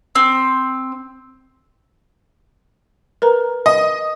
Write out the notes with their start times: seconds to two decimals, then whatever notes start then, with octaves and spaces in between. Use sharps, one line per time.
0.15 C4
3.22 A#4 B4 A#5
3.66 D#5